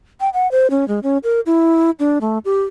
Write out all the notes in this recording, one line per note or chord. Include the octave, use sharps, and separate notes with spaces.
G5
F#5
C5
C#4
G#3
C#4
A#4
E4
D4
A3
G4